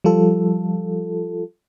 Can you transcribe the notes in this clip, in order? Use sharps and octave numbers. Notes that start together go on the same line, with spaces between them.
F3 G3 F4 A4